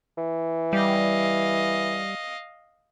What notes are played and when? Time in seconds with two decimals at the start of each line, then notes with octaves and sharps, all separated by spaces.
0.18 E3
0.73 G3 D#5 F5